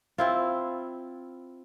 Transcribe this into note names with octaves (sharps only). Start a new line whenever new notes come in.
C4 E4 F4